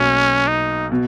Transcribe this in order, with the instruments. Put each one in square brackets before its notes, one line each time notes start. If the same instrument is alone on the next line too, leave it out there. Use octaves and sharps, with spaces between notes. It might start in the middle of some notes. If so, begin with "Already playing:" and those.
Already playing: [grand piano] B1 B2 A#3 [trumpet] C#4
[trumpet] D#4
[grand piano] B2